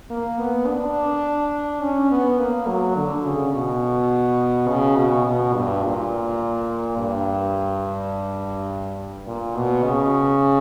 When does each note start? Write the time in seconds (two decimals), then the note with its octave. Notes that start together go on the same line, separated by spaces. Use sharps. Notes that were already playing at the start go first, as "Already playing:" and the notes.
0.10 A#3
0.39 B3
0.67 D4
1.82 C#4
2.11 B3
2.39 A#3
2.67 F#3
2.96 D3
3.25 C#3
3.53 B2
4.68 C#3
4.97 B2
5.26 B2
5.54 G2
5.84 A#2
6.98 G2
9.27 A#2
9.56 B2
9.84 C#3